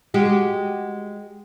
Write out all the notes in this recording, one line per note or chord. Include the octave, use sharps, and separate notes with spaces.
G#3 F#4 G4